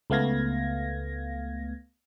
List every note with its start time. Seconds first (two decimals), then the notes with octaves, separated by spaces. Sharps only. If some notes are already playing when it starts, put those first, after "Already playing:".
0.10 C#2 A3 B3 F5 G#6 A#6